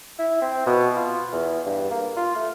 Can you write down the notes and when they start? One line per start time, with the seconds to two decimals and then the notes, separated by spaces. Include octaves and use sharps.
0.19 E4
0.42 C4
0.66 B2
0.96 F4
1.33 E2
1.66 G2
1.91 A#3
2.17 F4
2.36 A3